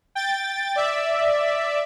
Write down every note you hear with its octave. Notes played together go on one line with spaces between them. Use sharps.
G5 A6
D5 E5